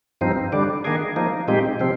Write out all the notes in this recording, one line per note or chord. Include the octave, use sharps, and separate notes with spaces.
G2 F3 C4 D#4
D3 G3 D4
D#3 A#3 D4 G#4
F3 A#3 D#4
A#2 G#3 C4 D#4 G4
C3 F3 C4